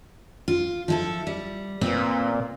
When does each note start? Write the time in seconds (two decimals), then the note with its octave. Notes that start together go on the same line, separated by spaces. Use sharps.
0.48 F4
0.88 F3 E4 A4
1.27 G3
1.81 A#2 C4 B4